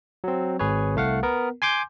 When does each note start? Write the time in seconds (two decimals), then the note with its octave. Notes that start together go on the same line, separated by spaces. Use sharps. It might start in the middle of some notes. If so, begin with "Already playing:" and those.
0.24 F#3 C4
0.59 G#1 G#4 B4 C#5
0.96 C2 A3 F5 F#5
1.23 B3 A#4
1.62 G#5 C6 D6 G6